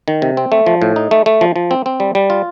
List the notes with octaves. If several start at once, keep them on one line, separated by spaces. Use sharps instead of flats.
D#3
C3
C4
A3
F3
A2
D#4
A3
A3
F3
F3
C4
C4
G3
G3
F4